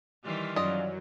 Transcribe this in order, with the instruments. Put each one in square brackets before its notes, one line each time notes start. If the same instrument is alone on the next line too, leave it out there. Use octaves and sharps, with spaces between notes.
[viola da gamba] D#3 E3 G3 [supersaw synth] C6 F6 B6
[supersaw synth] F#2 F#3 [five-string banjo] F4 D#5 [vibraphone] D5